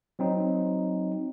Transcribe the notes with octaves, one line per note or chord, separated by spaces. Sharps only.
F#3 C4 D#4